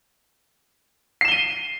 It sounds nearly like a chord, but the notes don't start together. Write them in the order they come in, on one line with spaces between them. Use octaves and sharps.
C7 E7 G7 D#7